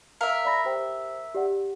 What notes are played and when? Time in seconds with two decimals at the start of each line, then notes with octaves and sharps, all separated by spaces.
0.21 A#4 E5 F5
0.45 D5 B5 A#6
0.65 G4 C5 G5
1.35 G4 D5 F#5